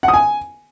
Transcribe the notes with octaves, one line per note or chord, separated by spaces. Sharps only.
F#5
D#6
G#5